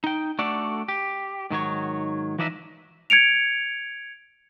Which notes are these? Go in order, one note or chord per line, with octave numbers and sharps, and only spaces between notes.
D#4 G5
A3 D4 F#4 A4 D5
G4
G#2 D#3 F#3 C#5
E3 F3 D4 D#4 D#5 E5
G#6 C#7 D7 F7